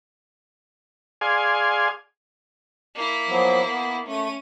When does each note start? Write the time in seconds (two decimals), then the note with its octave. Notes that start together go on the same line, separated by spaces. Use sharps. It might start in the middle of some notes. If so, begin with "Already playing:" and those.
1.21 G#4 D5 F5 G#5 C6
2.95 A#3 E4
3.29 F3 F#3 B3
3.69 B3
4.07 A3 C#4 D#7